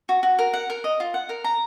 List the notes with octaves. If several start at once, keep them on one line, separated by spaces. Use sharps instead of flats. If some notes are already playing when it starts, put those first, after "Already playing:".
F#4
F#4
A#4
F#5
A#4
D#5
F4
F#5
A#4
A#5